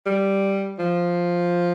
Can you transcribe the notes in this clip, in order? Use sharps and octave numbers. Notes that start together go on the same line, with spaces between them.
G3
F3